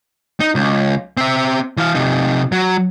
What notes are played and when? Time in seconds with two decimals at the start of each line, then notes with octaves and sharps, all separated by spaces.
0.40 D#4
0.55 C#2
1.17 C4 E5
1.77 E3 F5
1.95 C3 D#4
2.52 F#3